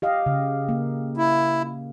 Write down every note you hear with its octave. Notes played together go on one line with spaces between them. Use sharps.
G4 D#5 F5
C#3
A#3
E4